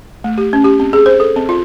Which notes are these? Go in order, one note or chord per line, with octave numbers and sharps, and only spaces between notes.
A3
G4
C#4
G4
C4
G#4
C5
A4
C4
F4